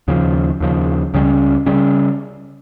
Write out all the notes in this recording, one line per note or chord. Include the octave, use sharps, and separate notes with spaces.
D#2 C#3 F3
D#2 C#3 F3
C#2 C#3 G3 C#4
C#3 G3 C#4